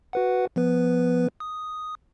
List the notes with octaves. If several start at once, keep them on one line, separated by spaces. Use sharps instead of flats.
F#4 B4 F#5
F3 B3 B4
D#6